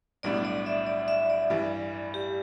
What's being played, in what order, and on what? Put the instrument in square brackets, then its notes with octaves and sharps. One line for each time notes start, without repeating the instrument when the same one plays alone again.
[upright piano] B1 A2 G3 D4 [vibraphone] D5
[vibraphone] D5
E5
D5
E5
D5
[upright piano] G2 E3 G3
[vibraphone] G4